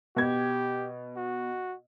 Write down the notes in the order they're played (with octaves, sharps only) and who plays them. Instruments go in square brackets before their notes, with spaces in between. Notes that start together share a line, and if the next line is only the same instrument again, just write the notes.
[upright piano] B2 G#6 [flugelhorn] G4
[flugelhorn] F#4